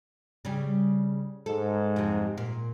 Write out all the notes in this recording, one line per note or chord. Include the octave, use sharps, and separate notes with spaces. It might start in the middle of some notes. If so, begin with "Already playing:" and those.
C#3 G3
G#2 A4
F2 C3
A#2